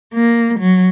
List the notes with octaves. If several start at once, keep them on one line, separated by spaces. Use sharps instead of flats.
A#3
F#3